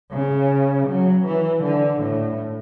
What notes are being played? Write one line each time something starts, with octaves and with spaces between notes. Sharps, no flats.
C#3
F#3
E3
D3
A2